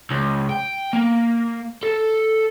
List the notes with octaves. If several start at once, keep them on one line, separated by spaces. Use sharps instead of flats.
C#2
G5
A#3
A4